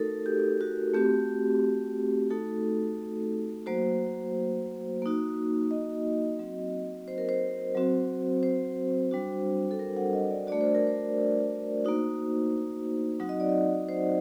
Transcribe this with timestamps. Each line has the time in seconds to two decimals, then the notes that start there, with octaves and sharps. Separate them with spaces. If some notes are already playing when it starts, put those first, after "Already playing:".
Already playing: A3 D#4 F#4 A4 A#4
0.26 G4
0.61 F#4
0.94 A3 C4 F#4 G4
2.30 A3 D#4 F#4 A4
3.66 F#3 A#3 F#4 C5
5.02 A#3 D#4 F#4
5.71 D#5
6.39 F#3 C4 F#4
7.08 C5
7.18 A#4
7.29 C5
7.75 F#3 C4 F#4
8.43 C5
9.11 G3 D4 F#4
9.71 A4
9.79 A#4
9.97 F#5
10.13 D#5
10.31 D5
10.47 A3 D4 F#4 D5
10.61 C5
10.75 A#4
10.87 C5
11.85 A#3 D#4 F#4
13.20 F#3 C4 D#4 F#4 F#5
13.29 D#5
13.40 D5
13.49 D#5
13.89 C5